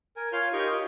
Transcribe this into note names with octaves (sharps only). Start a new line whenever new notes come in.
A#4 G#5
F4 C#5 F5 G#5 F6 G6
D#4 G4 A#4 D#5 G5 C#6
F4